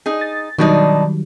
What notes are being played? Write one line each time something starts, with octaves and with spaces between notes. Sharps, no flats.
D#4 G#4
A6
B2 D#3 F#3 G3 D4 D#4